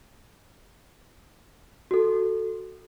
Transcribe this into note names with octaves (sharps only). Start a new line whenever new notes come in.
F#4 A4